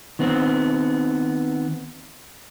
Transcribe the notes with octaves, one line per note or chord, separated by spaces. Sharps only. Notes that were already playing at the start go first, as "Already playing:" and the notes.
D#3 B3 C4